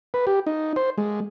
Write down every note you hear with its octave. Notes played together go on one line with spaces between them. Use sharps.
B4
G4
D#4
C5
G#3